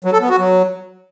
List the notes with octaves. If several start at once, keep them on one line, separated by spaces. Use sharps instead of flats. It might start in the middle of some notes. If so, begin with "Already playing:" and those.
F#3
A4
B3
F#4
F#3